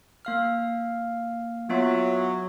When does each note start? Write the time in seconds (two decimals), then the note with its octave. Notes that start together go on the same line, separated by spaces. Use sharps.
0.25 A#3 F5 F6
1.70 F#3 B3 F4 E5